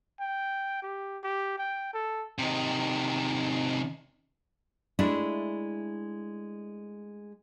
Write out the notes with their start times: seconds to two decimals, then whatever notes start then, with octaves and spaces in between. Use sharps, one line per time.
0.20 G5
0.83 G4
1.24 G4
1.58 G5
1.94 A4
2.39 C3 D#3
4.99 G#3 A3 D4 E4